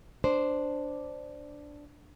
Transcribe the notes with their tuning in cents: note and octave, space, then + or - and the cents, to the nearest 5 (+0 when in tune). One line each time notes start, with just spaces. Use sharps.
D4 +0 C5 -5